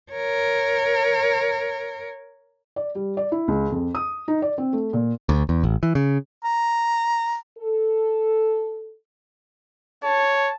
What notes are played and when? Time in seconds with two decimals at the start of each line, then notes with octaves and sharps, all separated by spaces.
0.12 A#4 C#5
2.76 D5
2.95 G3
3.17 D5
3.32 E4
3.48 C#2
3.71 F2
3.95 D#6
4.28 D#4
4.42 D5
4.58 C4
4.73 A3
4.93 A#2
5.29 D2
5.49 E2
5.64 A1
5.83 E3
5.95 C#3
6.44 A#5
7.58 A4
10.03 C#5 A5